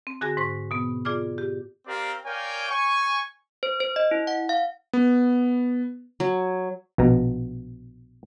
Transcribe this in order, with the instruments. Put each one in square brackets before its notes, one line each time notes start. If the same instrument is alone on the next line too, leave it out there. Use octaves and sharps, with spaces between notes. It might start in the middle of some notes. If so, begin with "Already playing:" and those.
[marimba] C4
D3 F#4 G#4 G#5 A#6
G#2 C5 C#6
B2 B3
F4 G#4 D5 D6 F6
G4
[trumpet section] C4 G4 A#4 D5 F5 A#5
A#4 C#5 D5 F5 G5 G#5
G#5 C#6
[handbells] C5
C5
D#5
E4
F#5
F5
[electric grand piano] B3
[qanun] F#3
[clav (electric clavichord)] A#1 B2 A#5